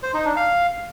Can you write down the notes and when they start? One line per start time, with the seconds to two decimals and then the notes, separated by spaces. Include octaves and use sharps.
0.03 C5
0.14 D#4
0.25 D4
0.36 F5